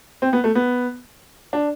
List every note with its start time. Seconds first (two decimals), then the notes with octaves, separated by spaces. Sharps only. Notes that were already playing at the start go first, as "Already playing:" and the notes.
0.22 C4
0.33 B3
0.44 A3
0.55 B3
1.53 D4